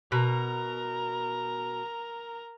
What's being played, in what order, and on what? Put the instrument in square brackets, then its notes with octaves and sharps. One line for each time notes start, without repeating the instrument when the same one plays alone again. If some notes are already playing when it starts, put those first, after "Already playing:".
[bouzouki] B2 [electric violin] A#4 A#5